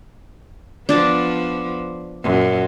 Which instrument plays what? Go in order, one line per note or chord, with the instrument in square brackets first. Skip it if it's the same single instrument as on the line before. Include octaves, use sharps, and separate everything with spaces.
[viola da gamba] F3 B3 [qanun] D4 D5 A5
[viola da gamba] F#2 A#2